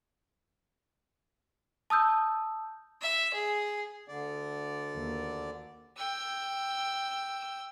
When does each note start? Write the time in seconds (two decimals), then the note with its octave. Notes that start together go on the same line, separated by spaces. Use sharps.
1.90 A5 D#6 E6 G6
3.02 E5
3.34 G#4
4.08 D2 D3 D5
4.95 D#2
5.97 G5 E6